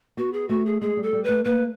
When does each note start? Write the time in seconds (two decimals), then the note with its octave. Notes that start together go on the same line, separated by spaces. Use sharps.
0.17 B3 F#4
0.33 G#4
0.49 A3 F#4
0.66 G#4
0.81 G#3 G#4
0.97 G3
1.03 A4
1.13 G3
1.24 A3 B4
1.44 A#3 B4